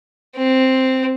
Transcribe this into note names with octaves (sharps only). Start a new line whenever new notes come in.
C4